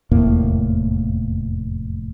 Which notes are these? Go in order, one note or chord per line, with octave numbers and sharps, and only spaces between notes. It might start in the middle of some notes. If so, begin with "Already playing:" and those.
F1 E2 A2 A#3